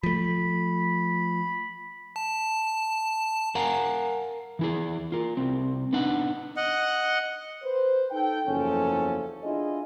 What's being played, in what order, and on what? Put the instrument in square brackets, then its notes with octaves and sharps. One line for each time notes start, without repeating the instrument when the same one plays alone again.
[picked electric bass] F3 A3 [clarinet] B5
[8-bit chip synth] A5
[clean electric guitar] A#4 F5 F#5 G#5 A#5
E3 E4 G#4
F4 A#4
C2 C4
B3 D4 D#4 F#5
[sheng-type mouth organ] D#5 F#5
[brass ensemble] B4 C5
D#4 A4 G5
F#1 E2 F3 C#4 A4
D4 E4 F4 G#4 D#5